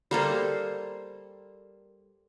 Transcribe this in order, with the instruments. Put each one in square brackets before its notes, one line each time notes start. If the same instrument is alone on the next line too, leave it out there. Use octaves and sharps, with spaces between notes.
[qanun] G3 A#3 A4 C5